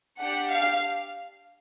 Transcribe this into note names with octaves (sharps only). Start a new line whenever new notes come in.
D4 G4 F#5
F5